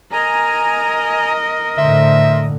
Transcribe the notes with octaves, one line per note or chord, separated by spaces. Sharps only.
A#4 D#5 G#5 A#5
A2 D3 C5 E5